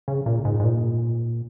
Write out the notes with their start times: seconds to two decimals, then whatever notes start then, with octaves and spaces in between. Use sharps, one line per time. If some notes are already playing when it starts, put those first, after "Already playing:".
0.08 C#3
0.26 A#2
0.45 G#2
0.60 G#2
0.64 A#2